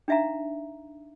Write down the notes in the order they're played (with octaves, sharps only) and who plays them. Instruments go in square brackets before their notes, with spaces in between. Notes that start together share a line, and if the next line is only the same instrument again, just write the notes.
[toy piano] D4 D#4 E5 F5 A#5